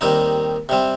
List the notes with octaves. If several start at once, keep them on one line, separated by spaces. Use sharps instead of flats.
D#2 D#3 G3 C4 D#4
C3 G3 C4